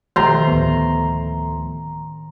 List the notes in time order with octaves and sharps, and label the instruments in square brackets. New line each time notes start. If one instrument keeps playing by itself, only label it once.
[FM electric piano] B1 G4 [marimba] D#3 [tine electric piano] F3 A3 [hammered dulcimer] A#5 C6
[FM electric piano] D2 B3 [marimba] A2